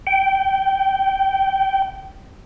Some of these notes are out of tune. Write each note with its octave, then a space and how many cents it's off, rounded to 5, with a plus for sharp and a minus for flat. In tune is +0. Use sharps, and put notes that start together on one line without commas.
G5 -20